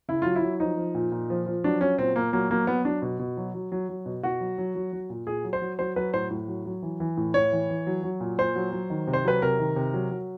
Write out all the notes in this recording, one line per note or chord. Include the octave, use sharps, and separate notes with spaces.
C#3 E4
F#3 F4
E4
F#3
F3 D#4
F3
A#2
A#2
F3
F3
F#3 D4
F#3 C#4
A#2 C4
A#2 A#3
F#3 A#3
F#3 A#3
F#3 B3
F#3 D4
B2
B2
F#3
F#3
F#3
F#3
B2
B2 F#4
F#3
F#3
F#3
F#3
A#2
A#2 G#4
F#3
C5
F#3
F#3 C5
F#3 B4
A2 C5
A2
F#3
F#3
E3
E3
A2
A2 C#5
E3
E3
F#3
F#3
A#2
A#2 C5
F#3
F#3
D#3
C3
C5
F#3 B4
C3 A#4
D#3
C3
F#3
F#3